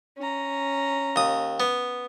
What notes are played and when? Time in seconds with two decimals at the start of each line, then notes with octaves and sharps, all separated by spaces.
0.18 C#4 A#5
1.16 D#2 D#6
1.60 B3